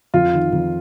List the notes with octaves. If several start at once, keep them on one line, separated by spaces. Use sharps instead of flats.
F2 F4
D#3
F2